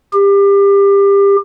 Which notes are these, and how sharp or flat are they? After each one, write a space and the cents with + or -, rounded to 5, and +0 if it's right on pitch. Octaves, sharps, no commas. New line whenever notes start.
G4 +25